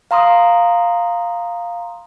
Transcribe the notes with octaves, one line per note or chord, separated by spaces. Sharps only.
F5 A#5 C6 D#6